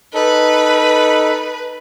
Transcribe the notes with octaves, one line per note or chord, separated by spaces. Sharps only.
D#4 A4 B4